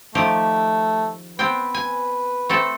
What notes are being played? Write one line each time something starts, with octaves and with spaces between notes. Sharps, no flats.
D#3 F3 A3 G4
B3 C4 B4 G5
G#5
A3 C4 A4